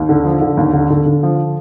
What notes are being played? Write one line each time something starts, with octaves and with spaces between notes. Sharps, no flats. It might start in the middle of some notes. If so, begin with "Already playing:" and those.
Already playing: D#2
D3
F3
D3
D#2
D3
D3
D3
F3